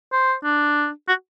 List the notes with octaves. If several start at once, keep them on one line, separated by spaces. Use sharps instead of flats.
C5
D4
F#4